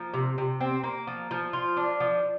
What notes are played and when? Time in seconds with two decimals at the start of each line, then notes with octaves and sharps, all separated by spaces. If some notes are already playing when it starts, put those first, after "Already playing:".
Already playing: F3 A#3
0.14 C3
0.38 C3
0.60 C4
0.84 A#3
1.07 F3
1.31 F3
1.53 F4
1.77 D4
2.00 F3